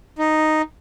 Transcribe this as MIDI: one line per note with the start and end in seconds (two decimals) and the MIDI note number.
0.18 0.62 63